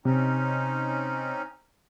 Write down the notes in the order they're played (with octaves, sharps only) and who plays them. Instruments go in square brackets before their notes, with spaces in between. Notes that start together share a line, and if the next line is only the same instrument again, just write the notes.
[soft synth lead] C3 [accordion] C4 C#4 D#4